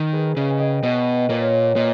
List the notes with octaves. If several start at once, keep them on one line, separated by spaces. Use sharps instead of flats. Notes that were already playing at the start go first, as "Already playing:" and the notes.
Already playing: D#3
G#4 B4
C#3 B4 D#5
G#5
D#5 G5
B2 B4 D#5
A#2 A#4 C#5
A#2 B4 D#5